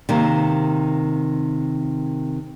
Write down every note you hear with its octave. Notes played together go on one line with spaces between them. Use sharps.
C3 D#3 A#3